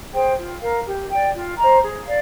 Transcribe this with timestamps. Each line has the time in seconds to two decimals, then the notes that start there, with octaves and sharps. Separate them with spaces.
0.12 G#4 C5 G5
0.37 F4
0.60 A#4 F5
0.85 G4
1.10 D5 G5
1.34 F4
1.57 C5 D#5 A#5
1.82 G#4
2.06 D5 F5